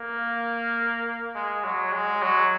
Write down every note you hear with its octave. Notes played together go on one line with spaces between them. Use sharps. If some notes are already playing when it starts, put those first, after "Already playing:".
Already playing: A#3
G#3
F#3
G#3
F#3